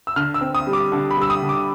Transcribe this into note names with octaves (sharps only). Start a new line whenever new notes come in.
E6
D3 F6
E6
C4
D#6
G3
D6
D3
B5
G3 E6
D#6
D3
D6